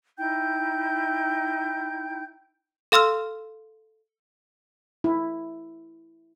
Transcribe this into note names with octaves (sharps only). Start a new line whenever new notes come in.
D#4 E4 G5 G6
A4 F5 C6 E6 F6
E4